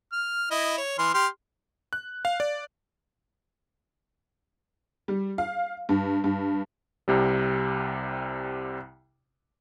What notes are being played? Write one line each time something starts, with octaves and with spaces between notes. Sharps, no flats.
F6
E4 D#5
C#5
E3 C6 F6
G4 C6 F6
F#6
F5
D5
G3
F5
G2
G2
C2 C3 G3